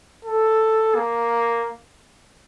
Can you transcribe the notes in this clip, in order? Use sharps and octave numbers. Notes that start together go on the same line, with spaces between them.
A4
A#3